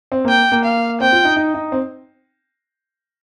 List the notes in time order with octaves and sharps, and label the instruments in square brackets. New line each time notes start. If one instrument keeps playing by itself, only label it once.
[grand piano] C4
[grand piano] A#3 [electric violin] G5
[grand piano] A#3
[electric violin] F5
[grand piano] C4 [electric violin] G5
[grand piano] F4
D#4
D#4
D#4
C4